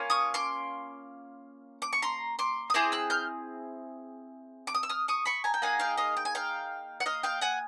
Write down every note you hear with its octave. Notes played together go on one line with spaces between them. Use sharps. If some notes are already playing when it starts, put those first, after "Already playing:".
Already playing: A#3 C#4 F4
C#6 D#6
C6 D6
D6
C#6
A#5 C6
C6 D6
D#6
C4 E4 G#4 C6 D6
E6 F#6
F6 G6
D6
D#6
E6
D#6 F6
C#6 D#6
B5 C#6
G#5 A#5
G5
A#3 D#4 G#4 F#5 G#5
F5 G5
D#5 F5
G5
G#5
F5 G5
F#5
D#5 F5
F5 G5
F#5 G#5